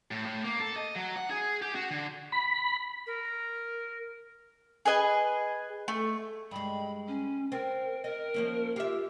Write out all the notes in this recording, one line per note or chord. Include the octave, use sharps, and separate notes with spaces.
A2
A2
A#3
A4
D#5
F#3
F#5
G#4
G4
F#4
D3
B5
A#4
G#4 B4 D#5 G#5
A3
G2 G#3 B5
C#4
C4 A#4
A#4 D#5
F3 A#3 C#4
F4 G4 E5